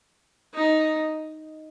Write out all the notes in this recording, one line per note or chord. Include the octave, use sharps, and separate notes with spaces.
D#4